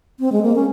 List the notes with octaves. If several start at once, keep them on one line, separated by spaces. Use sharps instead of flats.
C4
G#3
A#3
C#4